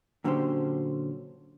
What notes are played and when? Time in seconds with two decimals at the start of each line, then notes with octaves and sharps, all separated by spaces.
0.24 A#2 D3 F#3 C#4 G4 C5